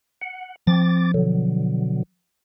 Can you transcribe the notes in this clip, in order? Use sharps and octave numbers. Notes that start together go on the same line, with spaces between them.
F#5
F3 C4 D6 A6
B2 D3 F#3